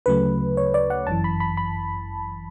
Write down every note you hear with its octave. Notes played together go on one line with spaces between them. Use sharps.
D2 C#3 F#3 A3 B4
C#5
D5
F#5
G1 F#2 E3 A5
B5
B5
B5